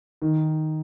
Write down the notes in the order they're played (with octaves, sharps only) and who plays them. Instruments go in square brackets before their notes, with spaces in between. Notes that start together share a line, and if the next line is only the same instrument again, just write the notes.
[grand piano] D#3